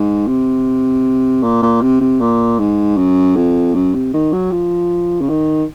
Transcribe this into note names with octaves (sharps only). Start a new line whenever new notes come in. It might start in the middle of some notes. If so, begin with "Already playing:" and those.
Already playing: G#2
C3
A#2
A#2
C3
C3
A#2
G#2
F#2
F2
F#2
C3
D#3
F#3
F3
C#3
D#3